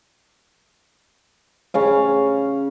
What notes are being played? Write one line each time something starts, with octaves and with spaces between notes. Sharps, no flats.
C#3 C#4 F5